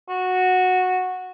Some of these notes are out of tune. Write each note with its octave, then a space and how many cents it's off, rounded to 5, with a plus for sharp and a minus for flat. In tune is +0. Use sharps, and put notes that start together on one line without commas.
F#4 -10